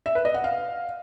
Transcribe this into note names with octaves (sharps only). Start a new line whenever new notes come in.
E5
B4
D#5
F#5
F5